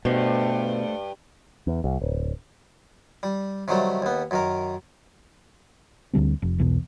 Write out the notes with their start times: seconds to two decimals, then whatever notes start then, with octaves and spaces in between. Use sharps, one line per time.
0.05 G2 B2 A3 C5
1.67 E2
1.84 C2
2.01 D1
3.23 G3
3.68 C3 D#3 F#3 G3 A3
4.02 D#2 B3
4.31 F#2 D#3 A#4
6.13 D2 D3 G3 C4
6.42 F1
6.58 B1 E2 B2